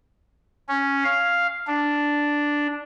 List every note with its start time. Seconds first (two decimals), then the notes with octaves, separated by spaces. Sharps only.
0.68 C#4
1.04 F5
1.67 D4